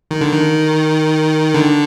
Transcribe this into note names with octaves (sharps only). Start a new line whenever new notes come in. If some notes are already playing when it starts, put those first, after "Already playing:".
D#3
D3
D#3
D3